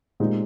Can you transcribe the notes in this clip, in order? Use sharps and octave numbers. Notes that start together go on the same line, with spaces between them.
A#2 G#3 C4 D#4 G4